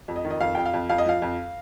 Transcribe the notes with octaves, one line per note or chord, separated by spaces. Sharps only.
F2
D#5
D#3
D#5
F2 F5
F2 G5
F5
F2
F2 F5
D#5
F3 F5
F2